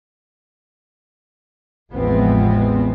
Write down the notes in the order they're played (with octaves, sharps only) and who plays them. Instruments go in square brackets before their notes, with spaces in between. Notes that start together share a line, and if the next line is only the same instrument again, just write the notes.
[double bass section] A1 E2 F3 G#3 B3 C4